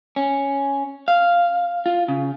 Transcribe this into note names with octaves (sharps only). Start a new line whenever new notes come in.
C#4
F5
F4
C#3